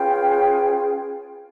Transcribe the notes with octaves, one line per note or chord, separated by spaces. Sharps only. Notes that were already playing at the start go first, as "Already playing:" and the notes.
Already playing: C#4 F4 G#4 B4 G5